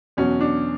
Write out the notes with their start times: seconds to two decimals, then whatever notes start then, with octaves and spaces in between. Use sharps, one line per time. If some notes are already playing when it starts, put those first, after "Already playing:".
0.17 E2 B2 F#3 C#4
0.41 D4